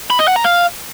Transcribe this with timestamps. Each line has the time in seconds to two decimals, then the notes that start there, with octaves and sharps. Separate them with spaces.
0.10 B5
0.19 D#5
0.28 F#5
0.36 A#5
0.45 F5